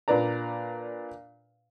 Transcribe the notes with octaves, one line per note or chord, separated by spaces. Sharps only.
A#2 D4 B4 D5 A#5